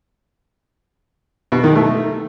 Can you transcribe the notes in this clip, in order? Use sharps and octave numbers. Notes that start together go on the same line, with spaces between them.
B2
D#3
A3